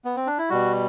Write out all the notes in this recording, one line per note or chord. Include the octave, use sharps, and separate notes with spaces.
B3
C4
D4
E4
B2 G3 F#4